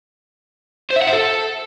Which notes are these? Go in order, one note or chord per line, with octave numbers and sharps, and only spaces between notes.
C5
E5
F#5
C5
A4